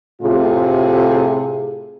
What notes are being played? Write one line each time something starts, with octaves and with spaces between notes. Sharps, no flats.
A2 C3 A3 F4 G#4